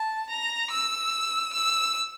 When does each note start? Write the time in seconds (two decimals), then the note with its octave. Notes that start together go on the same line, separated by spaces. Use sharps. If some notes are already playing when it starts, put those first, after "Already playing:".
Already playing: A5
0.29 A#5
0.71 E6
1.53 E6